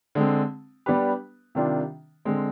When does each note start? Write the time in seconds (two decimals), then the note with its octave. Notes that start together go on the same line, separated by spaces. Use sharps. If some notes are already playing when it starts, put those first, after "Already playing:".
0.15 D3 G#3 C4
0.86 G3 B3 D4 G4 B4
1.55 C3 D#3 G3 D4 F4
2.25 D3 G#3 C4